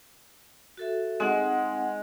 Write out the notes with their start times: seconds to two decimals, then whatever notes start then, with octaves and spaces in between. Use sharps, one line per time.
0.77 F#4 A4 E5
1.20 G#3 C4 D#4 F#5